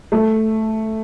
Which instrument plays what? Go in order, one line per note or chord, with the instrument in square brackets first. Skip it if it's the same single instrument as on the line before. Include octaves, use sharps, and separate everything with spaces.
[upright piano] A3